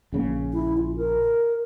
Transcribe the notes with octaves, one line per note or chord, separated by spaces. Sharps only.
A#1 C#3 A#3
E4
F4
A#4